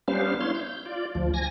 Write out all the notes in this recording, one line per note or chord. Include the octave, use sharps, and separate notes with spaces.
G3 B3 C#4 D4 C5 F5
E4 C#5 F5 C6
G6
F4 D5
D2 F3
G#5 A#6